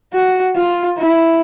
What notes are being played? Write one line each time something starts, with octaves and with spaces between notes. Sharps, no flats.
F#4
F4
E4